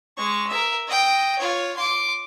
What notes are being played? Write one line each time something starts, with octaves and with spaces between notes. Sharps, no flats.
G#3 C#6
A#4 E5
D#5 G5
F4 C#5
C6 D6